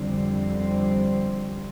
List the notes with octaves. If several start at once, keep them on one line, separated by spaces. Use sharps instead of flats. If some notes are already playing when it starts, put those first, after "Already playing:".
Already playing: F2 D3 G3 C4